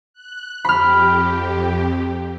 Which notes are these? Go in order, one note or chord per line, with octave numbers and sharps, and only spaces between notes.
F#6
F2 G4 B5 F6